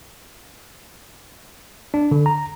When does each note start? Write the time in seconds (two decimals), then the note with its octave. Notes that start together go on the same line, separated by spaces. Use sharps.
1.94 D4
2.11 D3
2.26 A#5